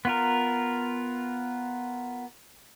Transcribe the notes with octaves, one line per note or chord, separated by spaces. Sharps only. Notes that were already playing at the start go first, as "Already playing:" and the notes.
B3 F4 A#4